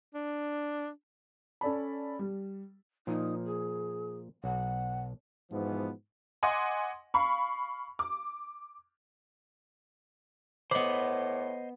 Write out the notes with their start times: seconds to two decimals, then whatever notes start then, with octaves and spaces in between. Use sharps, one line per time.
0.14 D4
1.61 C#4 A4 D5 A5 B5
2.19 G3
3.07 A#2 F3 D#4
3.45 G#4
4.44 B1 F#5
5.51 G#2 B2 E3 F3 B3
6.43 D#5 F#5 G#5 C6 D6
7.14 F5 B5 C#6
7.99 D6
10.71 A2 B3 C5 D#5 B5 D6